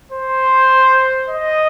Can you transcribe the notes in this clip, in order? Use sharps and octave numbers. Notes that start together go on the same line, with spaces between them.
C5
D#5